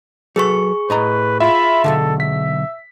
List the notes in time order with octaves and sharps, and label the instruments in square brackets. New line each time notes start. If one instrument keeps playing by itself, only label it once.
[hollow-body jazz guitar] F#3 A4 B4 [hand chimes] G#4 C#6
[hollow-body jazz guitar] A2 D#5 A#5 [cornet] B4
[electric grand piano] F4 E5 [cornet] B5
[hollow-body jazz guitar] B1 F2 D3 [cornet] A4
[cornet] E5 [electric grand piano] B6